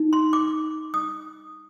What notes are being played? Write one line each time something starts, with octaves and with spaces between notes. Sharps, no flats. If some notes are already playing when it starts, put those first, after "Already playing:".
Already playing: D#4
C6
D6
D#6